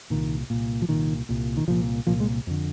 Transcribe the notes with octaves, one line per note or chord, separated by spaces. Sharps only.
C2 A#2 D#3
C2 A#2
F3
C2 A#2 D#3
C2 A#2
D#3
C2 A#2 F3
C2 A#2 F3
G#3
F2 D3